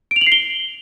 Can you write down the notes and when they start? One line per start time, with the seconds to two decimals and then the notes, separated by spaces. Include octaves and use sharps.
0.11 D7
0.16 F7
0.21 F#7
0.27 C7
0.32 G7